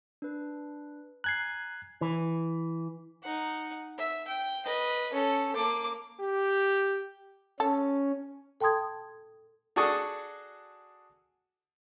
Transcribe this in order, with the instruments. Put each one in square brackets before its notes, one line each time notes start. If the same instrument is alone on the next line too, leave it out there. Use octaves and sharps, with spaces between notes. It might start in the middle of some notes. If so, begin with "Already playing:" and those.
[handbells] D4 B4
[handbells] G#5 A#5 [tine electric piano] F#6 G#6 C7
[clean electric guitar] E3
[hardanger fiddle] D#4 F#5
E5
G5
B4 D#5
C#4 A4
A#3 D6
[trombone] G4
[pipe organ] C#4 [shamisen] A4
[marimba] A4 G5 A5 C6 D#6 G#6
[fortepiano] D4 F#4 G#4 A4 C#6 D#6